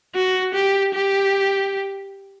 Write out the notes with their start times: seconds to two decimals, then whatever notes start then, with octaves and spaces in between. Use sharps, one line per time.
0.15 F#4
0.54 G4
0.94 G4